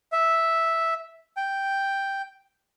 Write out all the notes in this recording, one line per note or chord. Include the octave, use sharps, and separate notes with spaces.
E5
G5